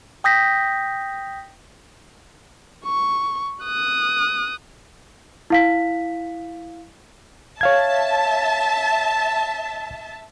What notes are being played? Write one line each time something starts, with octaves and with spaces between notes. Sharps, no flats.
G5 D#6 G6 A#6 B6
C#6
D#6 F#6
E4 F5 B6
C#5 E5 F5 A5 G#6